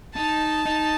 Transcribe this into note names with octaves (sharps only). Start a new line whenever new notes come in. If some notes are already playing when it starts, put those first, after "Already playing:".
D#4 A5
D#4